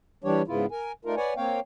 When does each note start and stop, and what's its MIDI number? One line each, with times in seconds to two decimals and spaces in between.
0.24 0.42 52
0.24 0.42 55
0.24 0.42 62
0.24 0.42 67
0.24 0.42 73
0.48 0.66 44
0.48 0.66 49
0.48 0.66 59
0.48 0.66 64
0.48 0.66 65
0.71 0.92 70
0.71 0.92 80
1.05 1.15 57
1.05 1.15 62
1.05 1.15 63
1.05 1.15 65
1.05 1.15 70
1.17 1.34 71
1.17 1.34 73
1.17 1.34 74
1.17 1.34 78
1.17 1.34 80
1.37 1.60 58
1.37 1.60 60
1.37 1.60 73
1.37 1.60 77
1.37 1.60 79